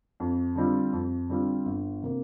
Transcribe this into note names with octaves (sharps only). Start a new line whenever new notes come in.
F2
D3 G3 C4 F4
F2
D3 G3 C4 F4
G1
C3 A#3